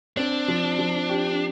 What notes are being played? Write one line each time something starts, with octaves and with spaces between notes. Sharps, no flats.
C4 D4
F3
F3
G4